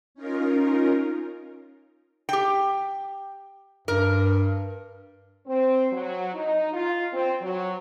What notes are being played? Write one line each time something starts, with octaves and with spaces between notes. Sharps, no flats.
C#4 D#4 F4 A#4
G4 G5
G2 A#4
C4
F#3
D#4
F4
C4
F#3